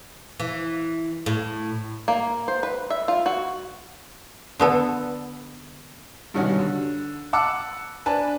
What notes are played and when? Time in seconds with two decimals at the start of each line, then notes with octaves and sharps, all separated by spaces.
0.40 E3
1.26 A2
2.08 A#3
2.48 C5
2.63 B4
2.90 E5
3.08 F4
3.26 F#4
4.60 D3 B3 A4
6.34 G2 B2 D#3 G3 C#4 F#4
6.59 D3
7.33 F#5 A5 B5 D6 E6 F#6
8.06 D4 B4 G#5 A5